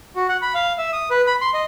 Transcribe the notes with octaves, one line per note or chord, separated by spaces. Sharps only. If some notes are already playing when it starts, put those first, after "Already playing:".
F#4
F#5
B5
F5
E5
D#6
B4
B5
C6
D#5